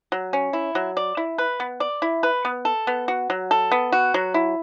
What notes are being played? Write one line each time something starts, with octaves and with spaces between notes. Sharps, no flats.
F#3
C#4
E4
F#3
D5
E4
B4
B3
D5
E4
B4
B3
A4
B3
F#4
F#3
A4
B3
F#4
F#3
E4